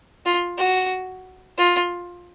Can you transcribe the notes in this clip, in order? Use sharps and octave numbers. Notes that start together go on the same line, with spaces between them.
F4
F#4
F4